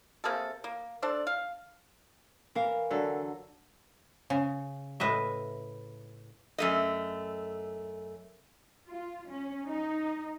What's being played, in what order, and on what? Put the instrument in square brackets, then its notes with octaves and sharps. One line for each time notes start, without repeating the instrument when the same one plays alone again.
[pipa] C3 A#3 G#4 A4
A#3
D4 A4 C5 D5
F5
[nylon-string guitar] E3 A#4 F5
[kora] D3 F#3 A4
[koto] C#3
A2 B4 D#5 E5
[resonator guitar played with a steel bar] F#2 A3 D#5
[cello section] F4
C#4
D#4